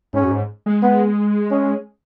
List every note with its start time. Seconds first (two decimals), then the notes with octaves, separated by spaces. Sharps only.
0.13 G#2 C#4
0.24 F#2
0.31 G#2
0.66 G#3
0.83 B3
1.51 C#4